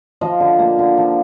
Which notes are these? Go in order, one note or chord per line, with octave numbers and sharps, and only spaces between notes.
F3 D#5
D3
A#3
D3
F3